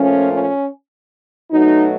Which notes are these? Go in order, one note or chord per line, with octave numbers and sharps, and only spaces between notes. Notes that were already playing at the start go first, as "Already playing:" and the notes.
Already playing: A#2 F3 A3 C#4
C#4
B2 F#3 A3 D#4